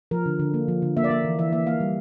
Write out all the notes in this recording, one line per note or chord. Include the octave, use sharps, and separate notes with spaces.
F3 A#4
D3
D3
A#3
F3
D3
A#3 E5
D5
A#3 E5
E3
E3 E5
A#3 E5
A#3 F5
G3